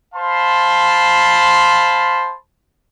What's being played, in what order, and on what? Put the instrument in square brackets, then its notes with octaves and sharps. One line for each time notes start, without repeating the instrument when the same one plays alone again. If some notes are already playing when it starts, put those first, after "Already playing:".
[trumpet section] C5 F5 A5 B5 C6